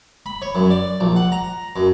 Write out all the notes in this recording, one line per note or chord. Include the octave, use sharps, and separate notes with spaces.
B5
C#5
F#2
D5
A#1
F#5
A#5
F#2